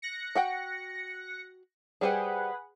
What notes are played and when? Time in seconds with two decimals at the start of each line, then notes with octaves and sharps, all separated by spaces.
0.02 F#6 A#6 C#7
0.35 F#4 F#5 G5
2.01 G3 G#4 B4 C5 F#5 G5